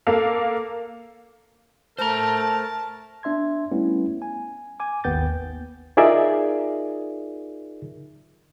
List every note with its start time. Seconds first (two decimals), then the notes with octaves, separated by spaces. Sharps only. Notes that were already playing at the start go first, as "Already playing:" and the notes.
0.07 A#3 A4 F5
1.99 A3 A#4 C5 A5 A#5
3.23 B3 D4 E5 C6 G#6
3.71 G3 A3 B3 C#4 E4
4.22 G#5
4.80 G#5 D6
5.04 G#1 D#2 B3 G5 G6 A6
5.97 D#4 F4 G#4 A#4 D5 E5